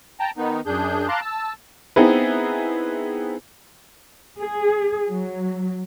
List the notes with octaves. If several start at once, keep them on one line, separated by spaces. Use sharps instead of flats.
G5 A5 A#5
D#3 B3 D#4
F#2 D4 G#4 G6
F5 A5 A#5 C6 D6 F#6
A5 E6
B3 C4 D#4 E4 G#4 B4
G#4
F#3